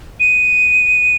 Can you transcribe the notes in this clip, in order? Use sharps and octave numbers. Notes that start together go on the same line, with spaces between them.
D#7